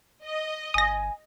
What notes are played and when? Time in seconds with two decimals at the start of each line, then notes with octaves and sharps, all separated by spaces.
0.24 D#5
0.74 G1 G#5 D#6 A#6